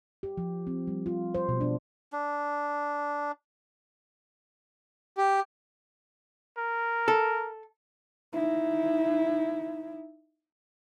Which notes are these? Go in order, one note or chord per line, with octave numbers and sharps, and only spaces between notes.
G4
F3
C4
G3
F4
C5
B2
D4
D4
G4
A#4
A4
D#4 E4